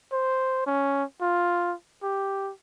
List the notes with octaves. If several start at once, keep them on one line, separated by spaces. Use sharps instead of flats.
C5
C#4
F4
G4